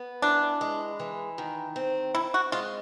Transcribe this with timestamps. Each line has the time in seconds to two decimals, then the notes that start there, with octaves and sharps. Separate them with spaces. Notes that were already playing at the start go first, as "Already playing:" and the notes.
Already playing: B3
0.22 E3 D4
0.61 G#3
0.99 E3
1.38 D#3
1.76 C4
2.15 C4 E4
2.34 F#4
2.52 G#3 F4